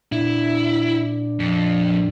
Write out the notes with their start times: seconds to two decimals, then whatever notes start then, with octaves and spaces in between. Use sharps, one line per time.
0.12 A#2 D4 E4
1.40 F2